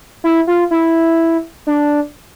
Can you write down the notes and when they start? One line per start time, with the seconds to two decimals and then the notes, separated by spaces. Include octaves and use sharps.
0.24 E4
0.47 F4
0.71 E4
1.67 D4